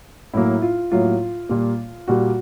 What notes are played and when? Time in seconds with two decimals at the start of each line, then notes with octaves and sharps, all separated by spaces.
0.34 A2 F#3 A#3 E4
0.62 F4
0.92 A2 F#3 A#3 F4
1.49 A#2 G3 A#3
2.08 A#2 G3 A#3 F#4